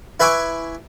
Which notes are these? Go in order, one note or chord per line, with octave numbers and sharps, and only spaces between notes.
E4 B4 E5 G#5 C#6 D6